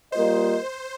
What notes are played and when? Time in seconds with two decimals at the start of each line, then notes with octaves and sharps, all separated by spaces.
0.12 G3 A#3 F4 A#4 C5 D#5